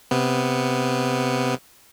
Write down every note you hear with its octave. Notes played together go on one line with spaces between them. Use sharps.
C3 B3